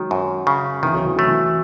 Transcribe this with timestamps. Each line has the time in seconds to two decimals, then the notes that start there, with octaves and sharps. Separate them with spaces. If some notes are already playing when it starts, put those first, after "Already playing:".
Already playing: D#3 F#3 G#3
0.11 F#2
0.47 C#3
0.82 D#3 E3
0.94 F#3
1.05 E3
1.16 F#3 A3
1.28 E3